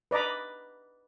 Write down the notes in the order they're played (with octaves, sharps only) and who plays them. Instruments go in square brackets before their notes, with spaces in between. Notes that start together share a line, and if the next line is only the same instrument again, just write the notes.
[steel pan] B4 D5 D#5 A#5 B5